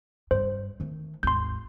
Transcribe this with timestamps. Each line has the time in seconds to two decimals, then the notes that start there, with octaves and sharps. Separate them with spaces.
0.31 G2 C5
0.80 D#3 A3
1.23 G#1 D#2 C6 G6